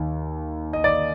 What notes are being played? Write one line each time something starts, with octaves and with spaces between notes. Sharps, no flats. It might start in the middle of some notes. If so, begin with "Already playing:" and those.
Already playing: D#2 D#3
D#5
D5